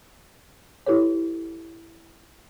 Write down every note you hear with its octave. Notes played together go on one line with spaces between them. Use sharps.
E4 G4 A4 B4 C#5